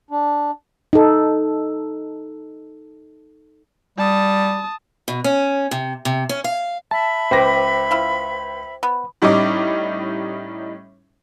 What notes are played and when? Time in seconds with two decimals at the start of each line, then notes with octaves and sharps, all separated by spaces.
0.11 D4
0.93 D#4 A4
3.98 G3 A5 D#6
5.08 B2
5.24 C#4
5.71 C3
6.05 C3
6.29 C#4
6.44 F5
6.91 E5 A5 B5
7.31 C#2 B4 C5 G5 D6 A#6
7.91 E4 F4
8.83 B3
9.22 A2 G3 C#4 D#4 D6